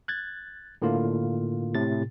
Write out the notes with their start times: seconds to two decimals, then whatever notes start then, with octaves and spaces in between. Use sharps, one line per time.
0.08 F#6 G#6 A6
0.82 A2 D3 A#3 F4
1.75 A2 C3 A6